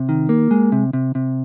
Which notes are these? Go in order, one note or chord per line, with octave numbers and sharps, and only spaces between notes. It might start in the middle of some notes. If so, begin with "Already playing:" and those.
Already playing: C3
D#3
A#3
G#3
C3
C3
C3